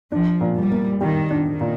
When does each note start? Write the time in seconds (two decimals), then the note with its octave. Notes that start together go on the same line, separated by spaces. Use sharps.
0.12 F3 D4
0.41 A#2
0.56 G3
0.71 A#3
1.01 D#3 G3
1.30 D4
1.45 D#3
1.61 A#2